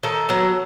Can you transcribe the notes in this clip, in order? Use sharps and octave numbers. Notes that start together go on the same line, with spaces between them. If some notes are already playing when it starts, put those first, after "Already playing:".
D#3 A4
F#3 B3